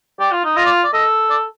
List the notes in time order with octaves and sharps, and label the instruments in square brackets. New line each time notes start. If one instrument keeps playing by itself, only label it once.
[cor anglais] G4 [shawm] D5
[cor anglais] F4
D#4
[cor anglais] F4 [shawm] D#5
[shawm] D5
D5
[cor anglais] A4 [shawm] D#5
[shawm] D5